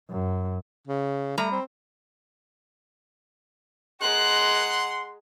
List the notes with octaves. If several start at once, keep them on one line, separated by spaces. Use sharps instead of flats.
F#2
C#3
G3 A3 A#5
C4
G#3 F#5 A#5 C6 F#6